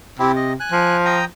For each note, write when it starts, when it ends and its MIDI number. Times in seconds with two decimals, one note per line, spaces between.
0.19 0.55 48
0.19 0.32 60
0.19 0.32 64
0.19 0.32 67
0.36 0.53 75
0.60 0.97 80
0.60 0.97 90
0.72 1.25 53
1.05 1.25 79
1.05 1.25 82
1.05 1.25 87